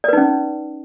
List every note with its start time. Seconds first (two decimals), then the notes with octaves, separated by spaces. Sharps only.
0.04 D5
0.08 B4
0.13 D#4
0.17 C#4